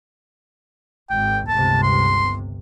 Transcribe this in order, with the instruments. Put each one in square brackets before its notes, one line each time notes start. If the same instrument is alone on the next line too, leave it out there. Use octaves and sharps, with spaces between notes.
[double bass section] G#1 [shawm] G5
[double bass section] G1 C#2 C3 [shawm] A5
[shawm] C6